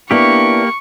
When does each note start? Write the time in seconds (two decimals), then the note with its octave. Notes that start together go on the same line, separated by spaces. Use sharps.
0.11 A#3 B3 D4 E4 G4 C#6